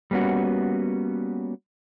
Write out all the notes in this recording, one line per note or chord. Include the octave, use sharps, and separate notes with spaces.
G3 A#3 B3 C#4 F#4